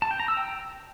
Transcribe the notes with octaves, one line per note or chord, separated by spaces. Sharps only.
A5
G5
A#5
E6
G5